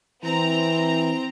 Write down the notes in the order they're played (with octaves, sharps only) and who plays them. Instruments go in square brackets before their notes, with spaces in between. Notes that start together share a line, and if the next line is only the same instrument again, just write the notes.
[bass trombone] E3 [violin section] C4 A#5